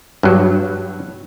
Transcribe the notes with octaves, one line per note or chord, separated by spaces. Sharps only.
G2 F#3